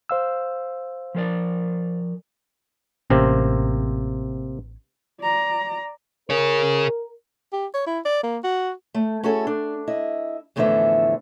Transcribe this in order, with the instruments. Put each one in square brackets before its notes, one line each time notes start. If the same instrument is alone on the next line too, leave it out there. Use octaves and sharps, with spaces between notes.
[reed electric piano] C5 F5 E6
[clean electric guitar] F3 A#4 D5
[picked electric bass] A1 C#4 [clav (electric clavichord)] C3 A#3 C4
[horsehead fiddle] D5 A#5
[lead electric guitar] G#4 C#5 [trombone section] A#4
[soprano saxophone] G4
C#5
E4
D5
A#3
F#4
[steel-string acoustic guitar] A3
C#4 E4 F#4 G#4 A4
D4
E4 D#5
E2 A2 D3 E3 F3 E5